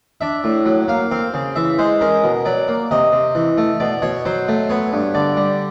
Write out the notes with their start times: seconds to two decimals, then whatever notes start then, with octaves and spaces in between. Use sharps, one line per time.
0.21 D4 E5
0.44 A2
0.66 F#3
0.88 A#3 F5
1.11 C4 F5
1.34 C#3
1.56 E3 E5
1.78 G#3 C5
2.01 C#4 A#4
2.24 B2
2.45 F#3 D5
2.68 A#3
2.91 C3 D#5
3.12 C3
3.35 E3
3.58 A3
3.80 B2 D5
4.02 B2 C#5
4.25 F#3 C5
4.48 A3
4.69 B3 C#5
4.93 G2
5.14 D3 D5
5.37 G3